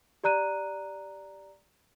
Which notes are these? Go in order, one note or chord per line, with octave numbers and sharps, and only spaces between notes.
G4 D5 A#5 F#6 D#7